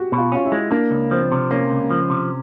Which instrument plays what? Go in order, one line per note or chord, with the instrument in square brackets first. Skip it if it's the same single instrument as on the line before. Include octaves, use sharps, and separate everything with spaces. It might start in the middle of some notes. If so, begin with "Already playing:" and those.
Already playing: [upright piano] F#4 G4
[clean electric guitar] B2
[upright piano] F4
[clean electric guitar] C#4 [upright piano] F4
[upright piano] E4
[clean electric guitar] G#3
[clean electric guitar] A#3 [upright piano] D4
[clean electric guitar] C#2
[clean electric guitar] F3 [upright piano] C4
[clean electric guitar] C3
[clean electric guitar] A#3 [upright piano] C#4
[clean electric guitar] C#2
F3
C3